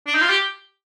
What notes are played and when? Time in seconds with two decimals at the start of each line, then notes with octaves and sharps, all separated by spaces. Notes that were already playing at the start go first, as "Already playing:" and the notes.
0.07 D4
0.15 D#4
0.22 F4
0.29 G4